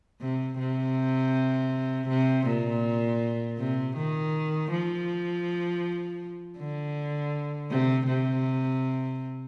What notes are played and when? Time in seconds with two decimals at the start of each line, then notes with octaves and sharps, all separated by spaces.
0.21 C3
0.58 C3
2.09 C3
2.47 A#2
3.59 C3
3.96 D#3
4.71 F3
6.58 D3
7.71 C3
8.07 C3